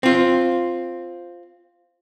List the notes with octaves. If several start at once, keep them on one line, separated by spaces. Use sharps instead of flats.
C4 F4